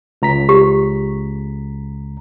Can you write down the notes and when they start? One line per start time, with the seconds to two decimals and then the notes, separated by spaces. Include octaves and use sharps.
0.22 C#2 A#5 B6
0.49 G4